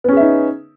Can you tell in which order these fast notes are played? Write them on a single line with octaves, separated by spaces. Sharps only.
B3 C#4 G#4 E5 D#4